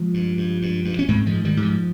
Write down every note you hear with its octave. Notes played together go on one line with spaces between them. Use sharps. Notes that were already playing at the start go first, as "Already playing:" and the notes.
Already playing: F3 G#3
G2
G2
G2
G2
C#4
G#2 G#3 C4
F3 G#3
G#2
D#3 G3
G#2
F3